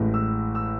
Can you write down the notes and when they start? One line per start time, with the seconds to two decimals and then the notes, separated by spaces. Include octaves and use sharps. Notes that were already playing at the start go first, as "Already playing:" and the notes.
Already playing: A1 A2 G#3
0.14 E6
0.55 E6